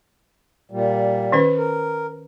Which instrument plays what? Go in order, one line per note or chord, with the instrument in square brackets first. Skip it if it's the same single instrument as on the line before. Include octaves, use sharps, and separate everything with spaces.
[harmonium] A#2 G3
[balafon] D#3 C#4 B4
[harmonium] A#4